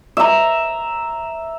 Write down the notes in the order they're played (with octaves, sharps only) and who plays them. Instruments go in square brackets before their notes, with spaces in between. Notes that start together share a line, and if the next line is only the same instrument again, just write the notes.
[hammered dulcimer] E5 A#5